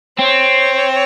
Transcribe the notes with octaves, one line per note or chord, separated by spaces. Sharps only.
C4 C#5